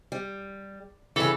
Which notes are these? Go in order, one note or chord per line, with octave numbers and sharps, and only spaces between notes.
G3
G2 C#3 E3 A4